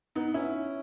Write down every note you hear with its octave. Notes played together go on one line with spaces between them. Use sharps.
B3 D#4
C#4 E4